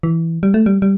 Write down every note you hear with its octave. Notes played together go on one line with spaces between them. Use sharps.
E3
G3
A3
G3
G3